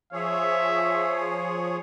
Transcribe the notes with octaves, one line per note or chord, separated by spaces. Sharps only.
F3 G#4 C#5 E5